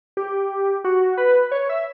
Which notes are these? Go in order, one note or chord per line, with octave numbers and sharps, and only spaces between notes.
G4
F#4
B4
C#5
E5